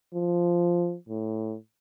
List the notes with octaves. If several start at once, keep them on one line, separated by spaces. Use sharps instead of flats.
F3
A2